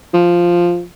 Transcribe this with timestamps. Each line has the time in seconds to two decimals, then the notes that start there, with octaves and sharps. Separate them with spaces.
0.14 F3